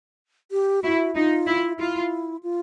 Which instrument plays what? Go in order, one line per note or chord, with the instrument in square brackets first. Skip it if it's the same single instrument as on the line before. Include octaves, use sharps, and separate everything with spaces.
[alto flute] G4
[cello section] E4 [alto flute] F#4
[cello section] D#4 [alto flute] F4
[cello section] E4
[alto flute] E4 [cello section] F4
[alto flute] F4